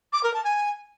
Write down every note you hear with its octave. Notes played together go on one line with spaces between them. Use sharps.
D6
A#4
A5
G#5